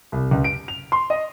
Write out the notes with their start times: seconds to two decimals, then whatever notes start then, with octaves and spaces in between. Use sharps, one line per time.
0.12 C2
0.31 C#2
0.44 D7
0.68 F7
0.92 C6
1.10 D#5